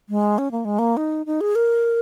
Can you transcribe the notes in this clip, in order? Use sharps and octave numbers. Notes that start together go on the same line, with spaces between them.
G#3
C#4
A#3
G#3
A#3
D#4
D#4
G#4
A#4